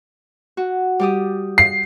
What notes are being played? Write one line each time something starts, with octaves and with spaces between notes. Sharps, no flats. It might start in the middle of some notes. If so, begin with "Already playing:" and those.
F#4
G3 G4 D#6
C7